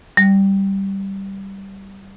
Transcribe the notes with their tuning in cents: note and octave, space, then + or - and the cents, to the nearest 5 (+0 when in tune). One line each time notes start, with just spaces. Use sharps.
G3 -5 G5 +0